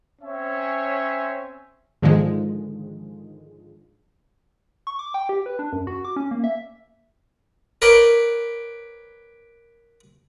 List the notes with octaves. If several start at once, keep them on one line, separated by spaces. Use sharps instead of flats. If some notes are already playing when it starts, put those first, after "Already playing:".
C4 C#4 C#5 E5 G#5
G#2 D3 D#3 F3 G#3
C#6
D6
G5
G4
B4
D4
F#2
F#4
D6
C#4
A#3
E5
A#4 B4 C#5 D5 G5